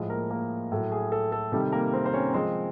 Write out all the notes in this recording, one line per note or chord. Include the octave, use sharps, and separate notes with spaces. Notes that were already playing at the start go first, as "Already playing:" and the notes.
Already playing: A2 F3 G#3
A#3 A#4
A#3 A#4
A2 F#3 A3
G#4
A4
A4
C3 D#3 G3 A4
A#3 A#4
C4 C5
C5
C#4 C#5
C3 F3 G#3 C4 C5